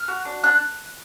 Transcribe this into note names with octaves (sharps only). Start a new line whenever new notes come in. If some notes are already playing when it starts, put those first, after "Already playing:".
Already playing: F6
F#4
D4
D4 F#6